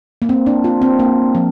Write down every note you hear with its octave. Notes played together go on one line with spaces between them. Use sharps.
A#3
C4
D4
F4
C4
A#3
F3